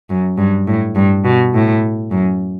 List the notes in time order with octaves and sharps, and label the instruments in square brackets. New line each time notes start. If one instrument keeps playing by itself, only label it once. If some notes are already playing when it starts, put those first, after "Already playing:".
[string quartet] F#2
G2
A2
G2
B2
A2
F#2